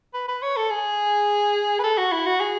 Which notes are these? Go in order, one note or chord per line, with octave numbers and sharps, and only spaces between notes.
B4
B4
C#5
A4
G#4
B4
A4
F#4
E4
F#4
G#4